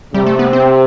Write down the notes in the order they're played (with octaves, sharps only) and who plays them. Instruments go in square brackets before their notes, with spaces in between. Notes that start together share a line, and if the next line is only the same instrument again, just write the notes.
[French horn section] C3 [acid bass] G3
[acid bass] A3
B3
C4